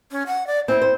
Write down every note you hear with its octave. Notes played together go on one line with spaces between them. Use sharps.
C#4
F#5
D5
C4 E4
C5